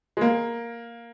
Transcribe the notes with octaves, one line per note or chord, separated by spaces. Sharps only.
G#3
A#3